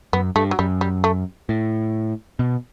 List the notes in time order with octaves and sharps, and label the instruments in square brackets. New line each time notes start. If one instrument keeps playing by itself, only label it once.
[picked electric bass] F#2 [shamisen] B3
[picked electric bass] G2 [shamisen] A3
[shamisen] F#3
[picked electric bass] F#2 [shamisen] G3
[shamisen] G3
A3
[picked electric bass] A2
B2